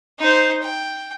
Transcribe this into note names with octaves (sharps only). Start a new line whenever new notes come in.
D#4 C5
G5